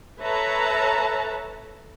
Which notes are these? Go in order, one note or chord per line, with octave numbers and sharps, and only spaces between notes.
A4 B4 C#5 E5 A5 A#5